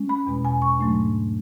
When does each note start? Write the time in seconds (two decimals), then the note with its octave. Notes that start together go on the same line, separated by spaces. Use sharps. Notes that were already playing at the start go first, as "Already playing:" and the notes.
Already playing: G#3 C#4
0.09 B5
0.26 E2 B2 G#3
0.45 G#5
0.62 C#6
0.79 G#2 F#3 A3 D4